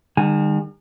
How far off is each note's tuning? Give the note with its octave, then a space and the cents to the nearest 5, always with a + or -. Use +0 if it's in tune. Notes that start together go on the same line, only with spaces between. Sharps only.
D#3 -35 G3 +45 G#5 +0